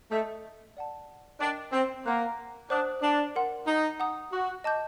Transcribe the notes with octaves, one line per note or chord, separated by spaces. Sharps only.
A3 D#5 A5 D#6 G6
D5 F#5 A5
D4 A#4 D#5 G5 D6
C4
A#3 A#4 F#5 C6 F#6
D4 C5 F#5 A5 D#6 F#6
D4
A#4 F#5 C6
D#4
F#5 A#5 D#6
F#4
D#5 A5 D6 G6